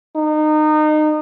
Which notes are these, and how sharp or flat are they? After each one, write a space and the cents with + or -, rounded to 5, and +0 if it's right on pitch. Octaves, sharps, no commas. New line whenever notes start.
D#4 -25